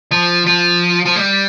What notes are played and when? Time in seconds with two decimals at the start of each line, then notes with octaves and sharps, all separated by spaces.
0.11 F3
0.46 F3
1.06 F3
1.16 G3